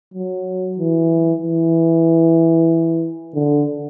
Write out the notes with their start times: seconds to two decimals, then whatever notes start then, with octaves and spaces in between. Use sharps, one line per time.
0.14 F#3
0.78 E3
1.43 E3
3.35 D3